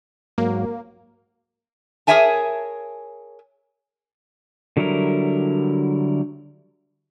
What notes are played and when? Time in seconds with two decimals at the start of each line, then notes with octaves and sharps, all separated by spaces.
0.38 G#2 F#3 A#3
2.07 G#4 A#4 C#5 E5 G#5 A5
4.77 D3 F#3 G3 E4 A#4